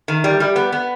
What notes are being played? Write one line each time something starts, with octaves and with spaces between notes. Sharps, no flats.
D#3
G3
G3
B3
B3